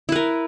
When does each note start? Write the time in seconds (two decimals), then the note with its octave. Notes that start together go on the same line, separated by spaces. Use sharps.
0.09 E4
0.12 B4
0.16 A#4